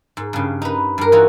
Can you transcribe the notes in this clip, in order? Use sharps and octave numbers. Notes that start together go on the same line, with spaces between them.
G#2
G2 C#3
D#4 B4
G2 A#4
E3 D#4 F4 F#4